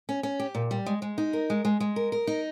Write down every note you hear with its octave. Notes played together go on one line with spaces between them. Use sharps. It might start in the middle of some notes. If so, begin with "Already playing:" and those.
C#4
C#4
G4
A#2
G3
G#3
G#3
D#4
A#4
G#3
G#3
G#3
A#4
A#4
D#4